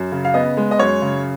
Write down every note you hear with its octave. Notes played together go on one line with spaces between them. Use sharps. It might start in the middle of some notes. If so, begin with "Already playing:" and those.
Already playing: F#2
C#3
F5
B3 D#5
G#3
D#5
F#2 C#5
C#3